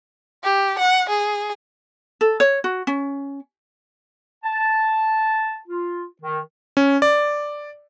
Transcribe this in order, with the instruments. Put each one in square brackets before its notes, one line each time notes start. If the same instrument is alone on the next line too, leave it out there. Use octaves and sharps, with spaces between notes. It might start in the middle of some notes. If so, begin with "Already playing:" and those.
[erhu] G4
F#5
G#4
[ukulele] A4
C#5
F#4
C#4
[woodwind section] A5
F4
D#3
[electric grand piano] C#4
D5